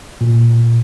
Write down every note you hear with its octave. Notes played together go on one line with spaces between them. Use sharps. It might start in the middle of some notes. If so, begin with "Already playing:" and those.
A#2